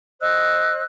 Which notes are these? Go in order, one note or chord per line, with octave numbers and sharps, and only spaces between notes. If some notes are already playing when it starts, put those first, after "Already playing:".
C5 D#5 E6 F#6